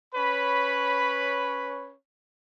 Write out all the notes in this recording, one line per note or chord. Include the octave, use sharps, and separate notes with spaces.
C#4 B4 C#5 B5